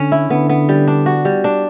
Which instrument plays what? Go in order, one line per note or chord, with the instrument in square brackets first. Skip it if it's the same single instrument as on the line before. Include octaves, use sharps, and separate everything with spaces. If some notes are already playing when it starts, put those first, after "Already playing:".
Already playing: [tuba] D3 [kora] C#4
[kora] E4
[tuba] D3 [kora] B3
[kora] B3
G3
D4
F#4
G3
D4